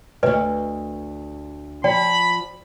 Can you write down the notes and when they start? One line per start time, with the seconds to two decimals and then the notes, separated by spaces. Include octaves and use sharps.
0.23 D2 G2 B4 D#5
1.84 F3 D5 G5 B5